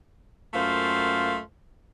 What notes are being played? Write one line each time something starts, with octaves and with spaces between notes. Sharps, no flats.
F#2 A3 A#3 F4 C5 F5